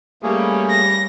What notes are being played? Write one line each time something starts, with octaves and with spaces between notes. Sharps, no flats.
G3 A3 A#3 C#4 G#4
A#6